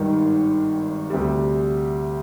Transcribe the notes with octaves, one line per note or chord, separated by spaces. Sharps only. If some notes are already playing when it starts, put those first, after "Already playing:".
Already playing: G#1 G2 D#3
D2 C3 G3